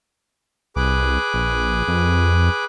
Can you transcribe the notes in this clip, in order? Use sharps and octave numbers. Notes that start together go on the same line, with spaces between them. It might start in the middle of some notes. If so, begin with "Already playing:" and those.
C2 G#4 B4 D6
A#1
F2